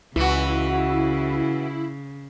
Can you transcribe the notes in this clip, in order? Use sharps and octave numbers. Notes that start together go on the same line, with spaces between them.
C#2 C#3 E3 E4 F#4